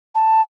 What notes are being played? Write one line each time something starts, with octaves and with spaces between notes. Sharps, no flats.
A5